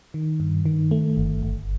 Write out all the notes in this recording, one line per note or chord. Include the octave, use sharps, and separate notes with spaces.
D#3
G2
D#3
A3
G1
G1